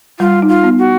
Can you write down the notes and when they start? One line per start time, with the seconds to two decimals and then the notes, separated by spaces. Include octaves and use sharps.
0.19 G3 F4
0.42 D#4
0.49 F4
0.64 B3
0.79 F#4